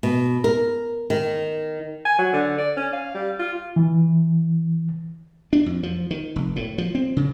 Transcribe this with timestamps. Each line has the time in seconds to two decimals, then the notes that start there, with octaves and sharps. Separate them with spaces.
0.03 B2
0.44 A#4
1.10 D#3
2.06 G#5
2.19 F#3
2.33 D3
2.59 D5
2.77 C#4
2.93 F5
3.15 G3
3.40 F4
3.76 E3
5.53 D4
5.66 F2
5.83 F3
6.11 D#3
6.36 F1
6.56 A2
6.78 F3
6.95 C4
7.17 C#3